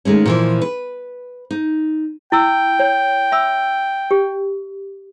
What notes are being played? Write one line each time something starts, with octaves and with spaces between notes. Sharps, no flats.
D#3 G#3 A3 C#4
A#2 E3 F3
B4
D#4
E4 G5 E6
C#5
E5 B5 E6
G4